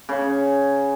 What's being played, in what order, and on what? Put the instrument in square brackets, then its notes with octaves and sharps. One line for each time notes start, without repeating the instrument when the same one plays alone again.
[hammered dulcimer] C#3